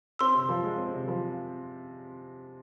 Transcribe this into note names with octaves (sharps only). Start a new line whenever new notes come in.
C4 C6 E6
C3
F3
G#3
C4
C3
F3